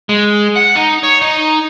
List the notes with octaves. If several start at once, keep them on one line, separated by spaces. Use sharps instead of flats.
G#3
F#5
D#4
C#5
D#4